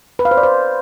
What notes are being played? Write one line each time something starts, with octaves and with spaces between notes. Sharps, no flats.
B4
F5
C5
D5
C5